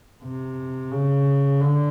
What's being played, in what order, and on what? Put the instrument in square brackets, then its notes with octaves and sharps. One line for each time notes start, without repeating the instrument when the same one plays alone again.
[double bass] C3
C#3
D3